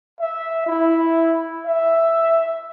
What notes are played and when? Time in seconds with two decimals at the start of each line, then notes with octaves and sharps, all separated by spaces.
0.20 E5
0.67 E4
1.66 E5